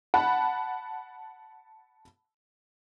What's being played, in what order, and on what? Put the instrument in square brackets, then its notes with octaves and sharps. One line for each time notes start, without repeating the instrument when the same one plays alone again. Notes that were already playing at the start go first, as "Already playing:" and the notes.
[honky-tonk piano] F#5 A5 B5